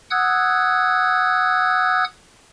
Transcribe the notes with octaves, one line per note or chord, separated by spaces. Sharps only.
F#5 D#6 E6 F#6 G#6